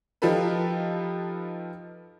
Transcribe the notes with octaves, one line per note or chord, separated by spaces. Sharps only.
F3 D#4 F4 G4 A4 B4